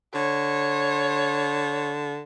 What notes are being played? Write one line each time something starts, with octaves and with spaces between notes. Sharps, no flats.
D3 C#5